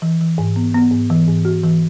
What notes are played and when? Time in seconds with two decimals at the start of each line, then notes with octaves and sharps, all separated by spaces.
0.02 E3
0.21 E3
0.38 G#2
0.56 B3
0.74 B3
0.92 G#2
1.10 E3
1.27 G#2
1.45 F#4
1.63 E3